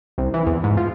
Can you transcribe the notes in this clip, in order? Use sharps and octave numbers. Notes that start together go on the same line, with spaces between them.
C2
E3
E2
G#2
F3